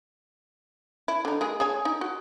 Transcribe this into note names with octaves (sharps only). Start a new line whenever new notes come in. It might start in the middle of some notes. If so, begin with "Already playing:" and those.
E4
D3 D#4
G#3 A#3 G#4
G#4 C#5 G#5
D#4
F#4